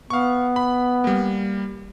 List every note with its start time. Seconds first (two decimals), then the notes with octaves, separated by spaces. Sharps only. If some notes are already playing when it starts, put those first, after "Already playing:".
0.10 B3 F5 C#6
0.56 B5
1.04 G3 A#3